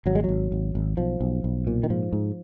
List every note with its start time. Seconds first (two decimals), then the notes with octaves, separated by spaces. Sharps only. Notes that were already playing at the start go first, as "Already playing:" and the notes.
0.06 G#1 F#3
0.15 G#3
0.24 G#1 F#3
0.52 G#1
0.75 G#1
0.97 B1 F3
1.21 B1
1.44 B1
1.67 A#2
1.83 D#3
1.90 G#2 F3
2.13 G#2